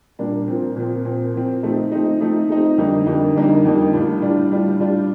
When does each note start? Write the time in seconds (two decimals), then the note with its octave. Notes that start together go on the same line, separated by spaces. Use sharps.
0.19 A#2 G3 A#3 D4
0.48 A#2 F3 C4
0.76 A#2 F3 C4
1.05 A#2 F3 C4
1.34 A#2 F3 C4
1.63 F3 A3 C4 D#4
1.92 F3 A3 C4 D#4
2.21 F3 A3 C4 D#4
2.49 F3 A3 C4 D#4
2.78 F2 D3 G3 A#3 D#4
3.06 F2 D3 G3 A#3 D#4
3.35 F2 D3 G3 A#3 D#4
3.65 F2 D3 G3 A#3 D#4
3.93 A2 G3 D4 F4
4.22 A2 G3 D4 F4
4.50 A2 G3 D4 F4
4.79 A2 G3 D4 F4